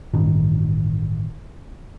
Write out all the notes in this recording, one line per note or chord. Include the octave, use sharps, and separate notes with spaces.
A1 G2 D#3